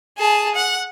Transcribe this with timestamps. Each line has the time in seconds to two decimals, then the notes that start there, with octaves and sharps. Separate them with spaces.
0.18 G#4 A5
0.55 F#5